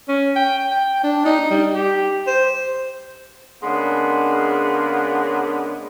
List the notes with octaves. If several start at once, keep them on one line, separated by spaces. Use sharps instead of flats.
C#4
G5
G5
D4
D#4
G3
G4
C5
C#3 G#3 A#3 B3 D4